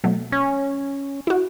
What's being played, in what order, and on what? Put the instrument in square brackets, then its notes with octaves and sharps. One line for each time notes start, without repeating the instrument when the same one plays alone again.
[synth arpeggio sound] B2 F#3 A3
[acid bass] C#4
[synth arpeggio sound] E4 F#4